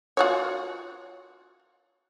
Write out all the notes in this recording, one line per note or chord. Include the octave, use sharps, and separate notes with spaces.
F4 F#4 C#5